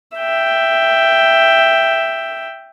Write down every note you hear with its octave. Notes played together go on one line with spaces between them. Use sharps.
E5 G5